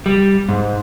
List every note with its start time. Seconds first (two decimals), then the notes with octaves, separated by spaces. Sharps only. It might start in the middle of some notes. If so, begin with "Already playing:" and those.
0.06 G3
0.49 G#2